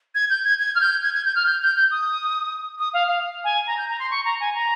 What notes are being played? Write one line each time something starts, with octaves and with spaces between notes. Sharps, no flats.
G#6
G6
G#6
G#6
F6
G6
G#6
G#6
G6
F6
G6
G6
G6
D#6
D#6
F5
F5
G#5
A#5
G6
A#5
C6
C#6
A#5
G#5
A#5